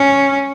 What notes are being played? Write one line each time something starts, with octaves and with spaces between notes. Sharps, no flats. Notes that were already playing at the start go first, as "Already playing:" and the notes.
Already playing: C#4